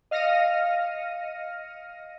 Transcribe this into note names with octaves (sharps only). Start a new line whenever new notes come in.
D#5 F5 F6 A#6 C#7 D#7